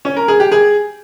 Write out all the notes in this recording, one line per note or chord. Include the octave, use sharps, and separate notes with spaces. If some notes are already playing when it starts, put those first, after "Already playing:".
C#4
A#4
G#4
G4
G#4